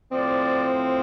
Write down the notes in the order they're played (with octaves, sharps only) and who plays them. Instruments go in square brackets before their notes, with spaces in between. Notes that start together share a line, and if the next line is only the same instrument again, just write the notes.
[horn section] A2 F3 C4 D5